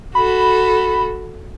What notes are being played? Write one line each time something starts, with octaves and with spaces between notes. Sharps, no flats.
F#4 A4 B5